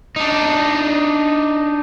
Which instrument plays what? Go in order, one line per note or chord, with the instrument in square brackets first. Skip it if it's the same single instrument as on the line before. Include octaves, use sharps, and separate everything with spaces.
[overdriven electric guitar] D4 D#4